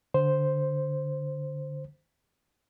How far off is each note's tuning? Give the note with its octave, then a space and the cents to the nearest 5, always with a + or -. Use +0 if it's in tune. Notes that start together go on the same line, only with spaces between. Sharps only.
D3 -5 C5 +0